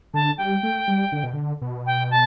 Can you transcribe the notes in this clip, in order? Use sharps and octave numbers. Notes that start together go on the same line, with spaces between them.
D3 A5
G3 G5
A3
G3
D3
B2
D3
B2
G5
A5